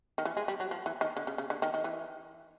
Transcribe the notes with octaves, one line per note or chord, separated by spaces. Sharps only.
D#3
E3
G#3
G3
F#3
F3
E3
D#3
D3
C#3
C#3
D3
D#3
D#3
E3